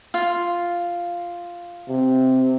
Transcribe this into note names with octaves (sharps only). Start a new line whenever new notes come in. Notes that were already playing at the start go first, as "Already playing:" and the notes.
F4
C3